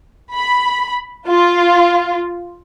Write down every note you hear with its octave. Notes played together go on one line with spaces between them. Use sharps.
B5
F4